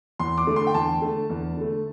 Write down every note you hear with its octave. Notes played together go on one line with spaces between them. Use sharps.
E2 C6
D6
D3 A3
C6
G5
E2 A5
D3 A3
E2
D3 A3